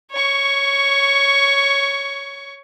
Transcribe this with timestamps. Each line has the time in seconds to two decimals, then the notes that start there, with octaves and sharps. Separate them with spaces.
0.11 C#5 C#6